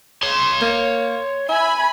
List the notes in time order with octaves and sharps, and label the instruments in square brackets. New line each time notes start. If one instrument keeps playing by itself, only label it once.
[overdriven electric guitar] C#5 C6
[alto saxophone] A#3
[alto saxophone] E5 [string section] G#5 B5